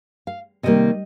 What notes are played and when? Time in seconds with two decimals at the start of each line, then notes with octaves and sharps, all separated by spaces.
0.27 F5
0.63 C3 D#3 G3 A#3 D#5